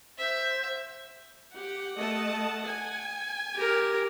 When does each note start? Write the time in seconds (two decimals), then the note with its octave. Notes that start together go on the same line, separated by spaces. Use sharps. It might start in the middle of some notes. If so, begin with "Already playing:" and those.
0.18 C5 E5
1.56 G4 F#5
1.97 A3 D#5 A5
2.64 G#5
3.55 G4 A#4